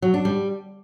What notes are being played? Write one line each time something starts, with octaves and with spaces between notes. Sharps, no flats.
F#3
D4
G3